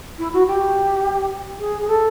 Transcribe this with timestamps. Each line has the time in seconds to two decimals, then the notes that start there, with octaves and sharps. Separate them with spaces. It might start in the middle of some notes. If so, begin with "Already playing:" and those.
0.18 E4
0.33 F#4
0.47 G4
1.59 G#4
1.81 G#4
1.87 A4